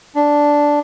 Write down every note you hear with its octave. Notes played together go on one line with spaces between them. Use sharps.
D4